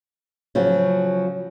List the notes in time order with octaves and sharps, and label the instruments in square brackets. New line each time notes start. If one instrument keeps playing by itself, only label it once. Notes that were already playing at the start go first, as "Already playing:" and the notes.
[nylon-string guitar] C#3 F3 F#3